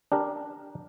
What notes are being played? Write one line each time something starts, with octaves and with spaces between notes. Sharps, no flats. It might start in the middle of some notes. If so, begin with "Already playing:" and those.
D4 G4 A#4